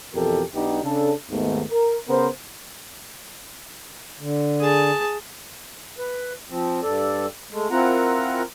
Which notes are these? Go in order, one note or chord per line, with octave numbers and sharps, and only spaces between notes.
F2 B2 E3 G4 A4 A#4
B1 B3 D4 D#4 G4
C#3 D4 A4
D#2 G#2 D#3 A3 B3
A#4
C#3 B3 A#4 C5
D3
G#4 A5
B4
F3 C4
G2 A4 D5
G#3 A3
C4 E4 F4 A#4 F#5 A#5